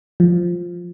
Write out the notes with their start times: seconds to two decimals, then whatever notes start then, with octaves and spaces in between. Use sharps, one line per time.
0.20 F3